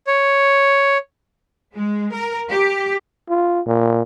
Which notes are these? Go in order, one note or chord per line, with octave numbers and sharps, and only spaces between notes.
C#5
G#3
A#4
G4
F4
A#2